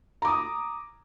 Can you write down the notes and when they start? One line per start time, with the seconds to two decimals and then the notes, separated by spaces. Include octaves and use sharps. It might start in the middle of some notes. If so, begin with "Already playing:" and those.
0.22 A#5
0.25 D6
0.27 D#6